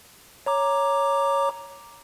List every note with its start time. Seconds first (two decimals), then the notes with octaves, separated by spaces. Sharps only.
0.46 C#5 A#5 D6